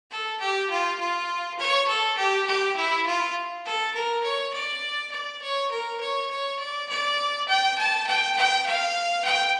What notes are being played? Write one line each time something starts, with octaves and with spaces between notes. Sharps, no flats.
A4
G4
F4
F4
C#5
A4
G4
G4
E4
F4
A4
A#4
C#5
D5
D5
C#5
A#4
C#5
C#5
D5
D5
G5
A5
G5
G5
F5
G5